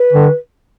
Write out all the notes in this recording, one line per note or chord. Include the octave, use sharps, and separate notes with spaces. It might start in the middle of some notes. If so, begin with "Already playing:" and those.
Already playing: B4
D3